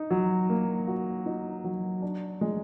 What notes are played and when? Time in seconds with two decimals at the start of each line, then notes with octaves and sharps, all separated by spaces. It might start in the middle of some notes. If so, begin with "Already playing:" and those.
Already playing: D#4
0.11 F#3
0.49 A#3
0.87 F#4
1.26 D#4
1.64 F#3
2.02 D4
2.41 G#3